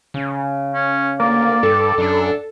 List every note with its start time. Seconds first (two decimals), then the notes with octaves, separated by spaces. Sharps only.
0.14 C#3
0.75 C#4
1.20 D2 A#3 D5
1.63 G2 G3 A4
1.98 F#2 D4